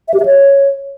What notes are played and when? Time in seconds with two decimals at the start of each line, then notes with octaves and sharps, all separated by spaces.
0.08 E5
0.14 G4
0.20 E5
0.25 C#5